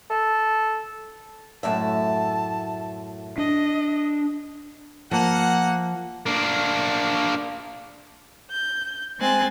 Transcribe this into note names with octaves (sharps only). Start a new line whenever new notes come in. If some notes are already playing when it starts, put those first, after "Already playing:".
A4
F#2 A2 E5 A5
D4 D#5
F3 A#3 F#5
A#3 D4
G6
G#3 C4 G#5 F#6 A6